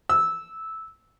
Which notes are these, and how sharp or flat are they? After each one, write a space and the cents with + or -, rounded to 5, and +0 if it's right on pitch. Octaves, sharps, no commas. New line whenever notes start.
E6 -10